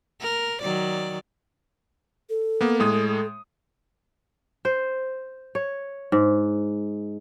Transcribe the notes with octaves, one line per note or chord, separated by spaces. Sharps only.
A#4
D#3 F#3 D5
A4
A#3 B3
A2 G#3 D#6
C5
C#5
G#2